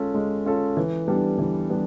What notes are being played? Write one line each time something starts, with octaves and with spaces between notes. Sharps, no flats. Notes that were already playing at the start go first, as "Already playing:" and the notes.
Already playing: G#3 C#4 F4 A4
G#3
C#4 F4 A4
E3
G3 B3 D4 G4
E3
G3 B3 D4 G4